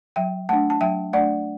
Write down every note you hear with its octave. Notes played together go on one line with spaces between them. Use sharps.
F#3 E5 G5
A3 D4 F#5 A5
A5
F#3 E5 G5
A3 D4 D5 F#5